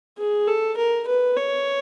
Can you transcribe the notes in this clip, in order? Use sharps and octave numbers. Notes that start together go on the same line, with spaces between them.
G#4
A4
A#4
B4
C#5